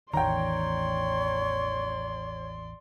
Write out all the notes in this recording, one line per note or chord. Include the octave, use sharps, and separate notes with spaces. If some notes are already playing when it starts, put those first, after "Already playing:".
A1 E2 D#3 C#5 D5 G5 A#5 C6